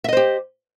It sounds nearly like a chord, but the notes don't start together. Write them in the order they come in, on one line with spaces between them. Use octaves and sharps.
E5 D#5 C5 G4